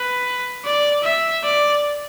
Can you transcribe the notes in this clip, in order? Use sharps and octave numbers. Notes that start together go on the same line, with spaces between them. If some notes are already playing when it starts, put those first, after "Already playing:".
Already playing: B4
D5
E5
D5